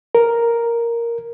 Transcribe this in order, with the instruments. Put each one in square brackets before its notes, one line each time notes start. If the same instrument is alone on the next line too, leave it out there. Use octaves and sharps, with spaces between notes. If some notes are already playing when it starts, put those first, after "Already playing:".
[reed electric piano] A#4